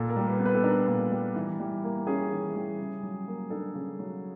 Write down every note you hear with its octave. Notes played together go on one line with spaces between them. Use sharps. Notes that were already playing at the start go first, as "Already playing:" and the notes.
Already playing: A#2 A4
A#4
G3
B4
B3
B4
A4
D4 A#4
A#2
G3
E3
G3
A#3
C#4 G#4
E3
G3
C#3
F#3
A#3
D4 A4
C#3
F#3